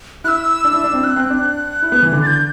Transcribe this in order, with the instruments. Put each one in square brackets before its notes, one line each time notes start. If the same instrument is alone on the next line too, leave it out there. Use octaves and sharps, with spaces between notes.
[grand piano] E4 [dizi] F#6
[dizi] E6
[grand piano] D4
E4
D4
C4
[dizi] F#6
[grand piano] C4
D4
E4
B3
E3
D3
[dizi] A6
G6